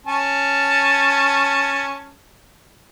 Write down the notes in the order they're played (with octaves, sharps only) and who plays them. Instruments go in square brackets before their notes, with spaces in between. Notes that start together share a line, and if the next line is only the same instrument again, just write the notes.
[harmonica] C#4 A5